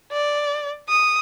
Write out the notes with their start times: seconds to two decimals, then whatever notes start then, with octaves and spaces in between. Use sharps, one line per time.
0.12 D5
0.89 D#6